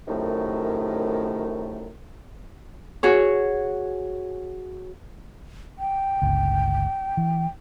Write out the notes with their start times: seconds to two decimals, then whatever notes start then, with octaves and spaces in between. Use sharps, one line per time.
0.08 F#2 A2 C3 D#3 A3
3.03 F#4 G#4 C#5
5.79 G5
6.22 G1 C#2
7.17 E3